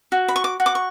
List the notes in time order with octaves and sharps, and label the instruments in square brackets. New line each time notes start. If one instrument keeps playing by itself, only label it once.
[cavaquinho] F#4
B5
C#6
D6
F#4
D6
C#6